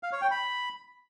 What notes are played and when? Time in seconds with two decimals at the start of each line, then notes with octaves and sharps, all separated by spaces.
0.03 F5
0.12 C#5
0.22 G5
0.31 B5